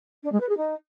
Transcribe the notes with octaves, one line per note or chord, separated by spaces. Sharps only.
D4
G#3
B4
G#4
D#4